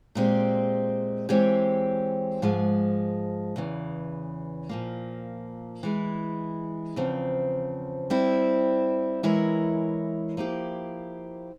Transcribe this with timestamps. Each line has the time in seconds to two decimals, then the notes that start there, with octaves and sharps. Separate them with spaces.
0.15 A#2 G#3 C4 G4
1.29 E3 G#3 C4 G4 C#5
2.42 G#2 F3 G#3
3.56 E2 C#3 E3
4.69 A#2 F3 A#3
5.83 E3 G#3 E4
6.96 E2 C#3 F3 C4
8.10 G3 C4 E4
9.23 E3 G#3 E4 A#4 C#5
10.37 F3 A#3 E4 G4